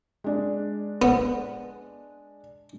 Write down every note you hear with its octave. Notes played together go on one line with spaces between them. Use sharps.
G#3 D4
B3